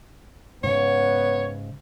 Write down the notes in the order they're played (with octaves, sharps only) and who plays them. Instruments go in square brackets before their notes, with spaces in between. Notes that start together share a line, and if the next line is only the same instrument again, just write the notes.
[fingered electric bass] G#2 C#3 [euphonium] B3 [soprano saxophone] C#5